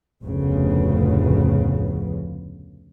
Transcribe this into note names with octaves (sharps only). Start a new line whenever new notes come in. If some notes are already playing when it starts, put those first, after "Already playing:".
F1 D2 A2 C#3 F3 B3